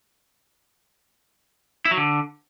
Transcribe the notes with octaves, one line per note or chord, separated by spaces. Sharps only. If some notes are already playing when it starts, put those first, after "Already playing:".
E4
F#3
D3